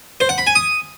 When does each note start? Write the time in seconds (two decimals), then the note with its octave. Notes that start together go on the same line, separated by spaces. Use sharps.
0.20 C5
0.29 F#5
0.38 B5
0.47 G#5
0.55 D#6